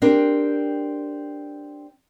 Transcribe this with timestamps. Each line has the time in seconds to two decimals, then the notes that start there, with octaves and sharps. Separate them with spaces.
0.02 C4 D4 G4 A#4